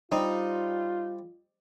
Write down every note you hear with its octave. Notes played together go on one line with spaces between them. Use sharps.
G3 C4 D#4 F4